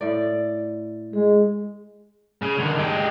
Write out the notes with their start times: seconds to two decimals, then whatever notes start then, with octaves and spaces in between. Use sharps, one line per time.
0.01 A2 D5
1.13 G#3 G#4
2.42 C#3
2.59 D3 D#3
2.79 G#3 G4